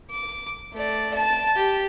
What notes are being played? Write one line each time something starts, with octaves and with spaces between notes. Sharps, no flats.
D6
A3 D5
A5
G4